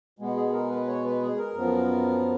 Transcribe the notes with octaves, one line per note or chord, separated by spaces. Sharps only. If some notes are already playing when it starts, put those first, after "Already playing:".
B2 G#3 B3
G#4
A#4
B4
C#5
B4
G#4
A#4
F#2 F3 B3